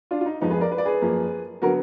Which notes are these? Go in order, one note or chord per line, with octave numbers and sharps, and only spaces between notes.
D4 F4
F4
D#4
F2 F3 G#3 B3 D#4
G#4 B4
A#4 D5
B4
D5
G#4 B4
F#2 F3 A#3
D3 F#3 B3 F#4 A#4